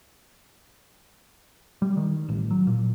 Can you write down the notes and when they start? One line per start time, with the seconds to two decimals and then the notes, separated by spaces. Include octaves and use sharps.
1.82 G3
1.97 D#3
2.29 A1
2.51 F#3
2.67 A#2